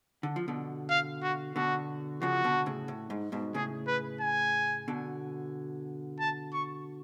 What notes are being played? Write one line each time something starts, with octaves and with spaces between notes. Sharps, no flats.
D3
F3
B2 D3
F5
F#4
B2 D3 F#4
C#3 F3 F#4
B2 D3
A2 C#3
A2
G#2
G#2 B2
A2 C#3 G#4
B4
G#5
B2 D3
A5
C#6